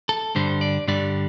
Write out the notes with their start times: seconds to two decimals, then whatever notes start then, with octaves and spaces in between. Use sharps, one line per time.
0.09 A4
0.35 G2 D3 G3 C5
0.61 D5
0.87 G2 D3 G3 D5